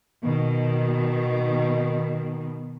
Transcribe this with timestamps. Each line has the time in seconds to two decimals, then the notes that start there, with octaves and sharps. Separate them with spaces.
0.24 B2 D#3